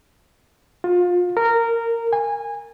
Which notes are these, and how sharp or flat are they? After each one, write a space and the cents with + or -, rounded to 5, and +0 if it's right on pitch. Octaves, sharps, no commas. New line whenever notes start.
F4 +25
A#4 -15
G#5 -20